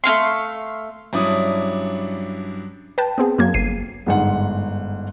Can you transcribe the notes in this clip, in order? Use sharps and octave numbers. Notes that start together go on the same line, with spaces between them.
A3 D#4 F5 C6
G2 F#3 C#4 D4 E4 D#6
B4 G5 A5
B3 C4 G#4
F#2 A#3 G#6
G1 C7 D#7
G1 G#2 F#5